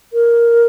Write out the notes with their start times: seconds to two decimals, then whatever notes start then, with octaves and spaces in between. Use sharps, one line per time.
0.13 A#4